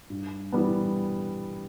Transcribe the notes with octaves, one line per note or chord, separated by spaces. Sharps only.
G2
E3 G3 B3